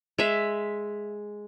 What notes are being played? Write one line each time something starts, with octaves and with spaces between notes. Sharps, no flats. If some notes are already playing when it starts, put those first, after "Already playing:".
G#3 E5